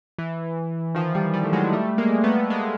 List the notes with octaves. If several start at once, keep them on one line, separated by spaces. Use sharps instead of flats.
E3
D#3 F3
F3 G3
F3 G3
A3
F#3 G#3
G3 A3
G#3 A#3
A3 B3
G#3 A#3